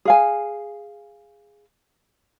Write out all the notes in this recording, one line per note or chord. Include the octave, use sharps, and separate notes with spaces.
G#4 F5 G#5